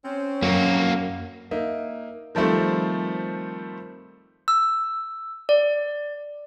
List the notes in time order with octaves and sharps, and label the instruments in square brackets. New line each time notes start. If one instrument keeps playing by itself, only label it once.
[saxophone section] C4 C#4
[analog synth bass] F#2 [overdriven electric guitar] A#3 F#4
[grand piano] A#3 D#4 E5
D#3 F3 G3 A3 C4
[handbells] E6
D5